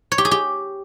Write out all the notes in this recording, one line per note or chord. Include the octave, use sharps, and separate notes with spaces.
C#5
G4
G#4
G4